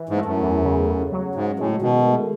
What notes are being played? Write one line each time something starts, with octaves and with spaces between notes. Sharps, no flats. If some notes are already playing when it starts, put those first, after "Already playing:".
Already playing: E3
G#2
A3
F#2
E2
C#3
C#3
F#3
G#2 C#3
A2 G#3
B2 D#3
A3